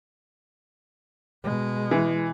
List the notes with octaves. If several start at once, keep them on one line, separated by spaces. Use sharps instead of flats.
B2 G#3
E3